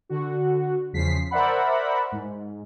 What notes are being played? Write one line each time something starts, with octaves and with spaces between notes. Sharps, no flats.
D3 F#4
E2 C#3 F3 B6 C7
A#4 C5 D5 E5 F#5 B5
G#2